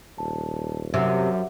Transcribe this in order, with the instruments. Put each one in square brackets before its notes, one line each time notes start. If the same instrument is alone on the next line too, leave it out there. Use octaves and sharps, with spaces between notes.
[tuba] D#1 [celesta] A5
[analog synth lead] F#2 [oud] C3 [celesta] E5 F#5